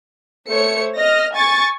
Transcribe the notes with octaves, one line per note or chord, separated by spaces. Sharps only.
A3 C5 C#5 C#7
D#5 F6 A#6
G#5 C#6 A6